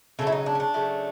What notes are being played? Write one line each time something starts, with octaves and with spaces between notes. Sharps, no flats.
C#3 F#3 A3 A4
E4
D#4
D4
C#4
D4
C#3 F#3 A3